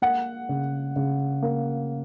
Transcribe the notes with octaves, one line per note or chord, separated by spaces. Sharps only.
A#3 F#5
C#3
C#3
A#3